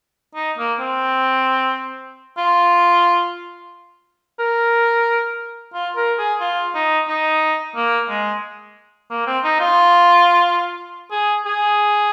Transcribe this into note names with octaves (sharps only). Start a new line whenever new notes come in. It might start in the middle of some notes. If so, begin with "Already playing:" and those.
D#4
A#3
C4
F4
A#4
F4
A#4
G#4
F4
D#4
D#4
A#3
G#3
A#3
C4
D#4
F4
G#4
G#4